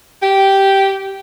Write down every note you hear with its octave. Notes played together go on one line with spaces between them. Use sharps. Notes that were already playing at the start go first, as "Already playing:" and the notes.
G4